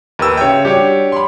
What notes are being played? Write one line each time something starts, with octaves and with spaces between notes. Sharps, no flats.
D#2 G4 A#4 B4 E6
C#3 C#5 E5 G5
G3 D4 F#4 G4 C#5
B5 C6